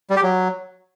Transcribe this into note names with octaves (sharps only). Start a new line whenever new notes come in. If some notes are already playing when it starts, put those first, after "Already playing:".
G3
G4
F#3